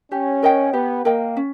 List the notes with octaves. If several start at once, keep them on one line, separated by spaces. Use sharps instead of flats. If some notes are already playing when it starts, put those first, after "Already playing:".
C#4 G4
A#4 D#5 G5
B3 G4
A#3 A#4 D#5 G5
C#4